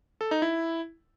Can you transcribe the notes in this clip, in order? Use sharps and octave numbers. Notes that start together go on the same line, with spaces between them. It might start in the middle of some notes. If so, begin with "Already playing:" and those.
A4
D#4
E4